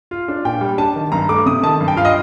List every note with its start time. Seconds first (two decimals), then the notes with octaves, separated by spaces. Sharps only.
0.11 F4
0.28 D4
0.45 A#2 G5
0.61 G3
0.78 D4 A5
0.96 D#3
1.12 G2 A#5
1.29 A3 D6
1.46 C3 D#6
1.63 D#3 A5
1.81 G2
1.88 G5
1.96 F4 F5
2.05 D#5